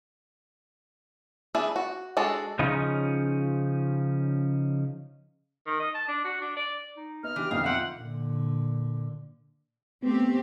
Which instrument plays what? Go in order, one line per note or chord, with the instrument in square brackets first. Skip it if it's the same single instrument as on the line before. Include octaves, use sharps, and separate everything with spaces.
[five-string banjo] E3 D4 G#4 E5
F#4
G#3 D4 F#4 A4
[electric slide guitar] C#3 F3 C#4 D#4
[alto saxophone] D#3
D#5
A5
D4
F#4
D4
D5
[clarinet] D#4
[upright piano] B3 D#5 [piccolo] F6
[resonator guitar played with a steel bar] E3 [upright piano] D4 G4 [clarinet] D6
[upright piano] B1 F2 D3 [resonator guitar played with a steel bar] D#4 [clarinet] F5
[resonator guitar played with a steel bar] C4 E5 [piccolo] F#5
[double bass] A#2 D3
[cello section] A3 C4 G4 [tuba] B3